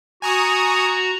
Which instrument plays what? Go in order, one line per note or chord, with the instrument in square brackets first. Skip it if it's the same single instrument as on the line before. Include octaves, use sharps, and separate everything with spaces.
[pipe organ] F#4 A#5 [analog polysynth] G#5 C#6 D#6